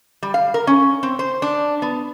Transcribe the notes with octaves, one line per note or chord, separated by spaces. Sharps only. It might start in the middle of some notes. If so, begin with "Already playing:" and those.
G3
F5
A#4
C#4
C4
C5
D4
B3